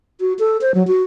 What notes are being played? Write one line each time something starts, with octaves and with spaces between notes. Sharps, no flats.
F#4
A4
C5
F#3
F#4